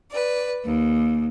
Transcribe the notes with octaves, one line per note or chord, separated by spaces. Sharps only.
B4 D5
D#2